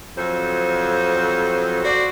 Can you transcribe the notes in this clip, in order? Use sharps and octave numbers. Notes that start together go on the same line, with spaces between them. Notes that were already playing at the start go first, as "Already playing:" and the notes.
F2 F#3 A4 C5
F#4 C5 D5